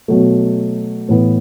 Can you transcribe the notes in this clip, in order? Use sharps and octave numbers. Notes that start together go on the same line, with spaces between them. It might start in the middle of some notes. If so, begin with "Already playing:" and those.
B2 F#3 A3
A2 E3 B3